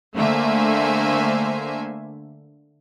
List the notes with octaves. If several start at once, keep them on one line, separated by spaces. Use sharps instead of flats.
D3 A3 A#3 C5 E5 G#5